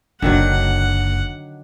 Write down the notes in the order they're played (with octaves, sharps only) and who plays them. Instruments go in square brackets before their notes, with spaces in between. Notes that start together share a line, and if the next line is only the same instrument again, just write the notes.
[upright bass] F#1 F#2 [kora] D3 D#3 F#3 [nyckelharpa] F#5